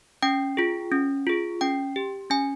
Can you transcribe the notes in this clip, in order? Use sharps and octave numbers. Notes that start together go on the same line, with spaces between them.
C#4 G5
F4 G#4
C#4
F4 G#4
C#4 G5
G4
C#4 G#5